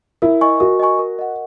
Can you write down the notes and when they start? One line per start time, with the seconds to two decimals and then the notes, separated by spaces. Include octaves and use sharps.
0.22 E4 A#4
0.41 D#5 G#5 C#6
0.60 F#4 A#4
0.79 D#5 G#5 C#6
0.99 A#4
1.19 D#5 F#5